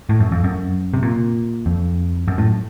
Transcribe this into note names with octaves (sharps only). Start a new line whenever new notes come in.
A2
F#2
F2
F#2
C3
A#2
F2
F#2
A2